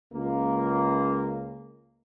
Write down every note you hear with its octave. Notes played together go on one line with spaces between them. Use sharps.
C#2 A#3